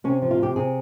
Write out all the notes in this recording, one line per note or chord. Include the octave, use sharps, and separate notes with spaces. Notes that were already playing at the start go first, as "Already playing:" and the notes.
C3 C#4
F3
F4
C3 G4
C3 G#4